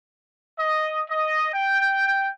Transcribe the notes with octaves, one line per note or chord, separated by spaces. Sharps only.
D#5
D#5
G5